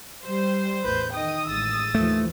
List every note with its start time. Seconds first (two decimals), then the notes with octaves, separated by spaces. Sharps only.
0.24 G3 C5
0.84 A1 E2 A2 B4 G6
1.12 D#3 D#5 G5 D#6
1.47 A1 G#3 E6 A6
1.95 D#2 E3 F3 A3